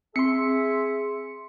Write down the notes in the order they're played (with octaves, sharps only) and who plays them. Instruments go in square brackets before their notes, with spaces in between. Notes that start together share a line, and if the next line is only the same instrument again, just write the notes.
[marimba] C4 [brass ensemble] G#4 [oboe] E5 [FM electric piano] C6 C#7